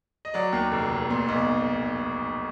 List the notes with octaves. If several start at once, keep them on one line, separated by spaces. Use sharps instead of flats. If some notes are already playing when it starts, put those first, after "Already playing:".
D#5
F#3 D5
D#2
F1
F1
A#2
B1